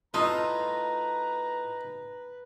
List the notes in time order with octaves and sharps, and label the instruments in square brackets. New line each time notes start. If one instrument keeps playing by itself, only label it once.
[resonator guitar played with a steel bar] A2 F4 A5 [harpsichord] D#4 [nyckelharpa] B4 [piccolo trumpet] A#5